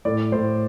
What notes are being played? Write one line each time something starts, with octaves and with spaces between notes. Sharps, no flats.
A2 D5
A2 C5